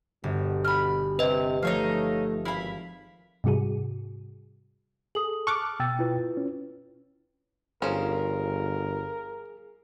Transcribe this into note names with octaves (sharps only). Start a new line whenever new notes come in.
G1 B2
B5 F6
C3 B4 D#5
F3 A3 D#4 C#5 F5
G#1 E4 F5 B5
G#2 C3 G3 F#4 G#4
G#4 A4 D#6 F#7
A5 C#6 D6 F6 F#6
B2 G5 E6 A6
E4 F4 B4
C#4
G1 F3 C#4 G#4 A#4